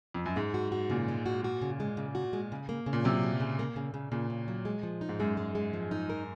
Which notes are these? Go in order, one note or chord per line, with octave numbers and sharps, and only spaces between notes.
F2
F#2
G#2 G#3
F#4
F#4
A#2 C#3
G#3
F#4
F#4
C#3
G#3
C#3
F#4
G#3
C#3
A#3
C#3
A#2
C3 F#3
C#3
C#3
A#3
C#3
C#3
A#2 C#3
C#3
F#3
G#3
F3
D#4
G#2
F#2 G#3
G#3
G#3
F3
D#4
A#4